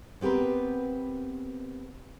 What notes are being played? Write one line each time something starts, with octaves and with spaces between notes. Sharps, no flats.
B3 C4 G4 A#4 B4